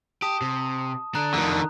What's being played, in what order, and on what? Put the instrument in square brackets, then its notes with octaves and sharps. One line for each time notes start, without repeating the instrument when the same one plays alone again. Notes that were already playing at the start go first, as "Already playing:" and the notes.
[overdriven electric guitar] G4 [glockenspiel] A5 D#6
[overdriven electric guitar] C3
[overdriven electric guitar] D3 D4 [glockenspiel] A#5 F#6
[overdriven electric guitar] F2 A3 [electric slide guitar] D3 D#3